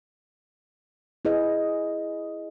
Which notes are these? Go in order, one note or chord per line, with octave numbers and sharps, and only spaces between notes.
E4 G#4 B4 D#5